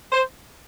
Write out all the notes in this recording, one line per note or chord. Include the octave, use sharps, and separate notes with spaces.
C5